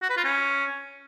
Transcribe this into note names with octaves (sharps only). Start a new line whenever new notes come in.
F#4
B4
F4
C#4